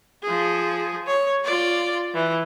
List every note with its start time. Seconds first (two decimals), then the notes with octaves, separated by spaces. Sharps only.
0.23 F3 G#4
1.07 C#5
1.44 F4 D5
2.14 E3